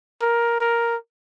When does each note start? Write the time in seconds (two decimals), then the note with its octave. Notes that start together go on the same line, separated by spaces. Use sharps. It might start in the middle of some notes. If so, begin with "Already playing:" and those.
0.21 A#4
0.61 A#4